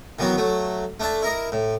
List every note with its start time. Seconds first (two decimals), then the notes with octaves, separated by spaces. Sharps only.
0.19 D#3 E3 F#3 B3 F#4
0.38 F#3 A3
1.00 A3 D4 E5 A5
1.22 E4 A#4 D#5
1.52 A2